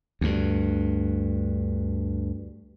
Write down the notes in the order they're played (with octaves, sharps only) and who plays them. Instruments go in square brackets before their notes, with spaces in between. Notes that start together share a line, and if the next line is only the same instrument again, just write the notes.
[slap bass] D2 G2